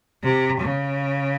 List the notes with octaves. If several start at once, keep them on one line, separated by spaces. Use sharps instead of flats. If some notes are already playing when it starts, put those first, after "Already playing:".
C3
C#3